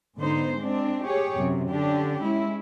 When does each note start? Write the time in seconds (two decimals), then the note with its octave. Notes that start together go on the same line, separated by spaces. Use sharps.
0.18 G#2 D3 B3 D#4 C5
0.60 G#3 C4 D4
1.07 G4 G#4 C#5
1.37 F#2 C3
1.71 D3 C#4 D4 G4
2.22 G#3 C#4 E4